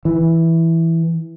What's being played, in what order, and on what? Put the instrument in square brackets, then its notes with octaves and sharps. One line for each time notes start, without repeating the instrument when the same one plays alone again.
[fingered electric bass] E3